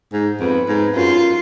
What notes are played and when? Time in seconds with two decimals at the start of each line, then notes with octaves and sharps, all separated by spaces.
0.13 G#2
0.40 F2 B3
0.68 G#2
0.96 F#2 F4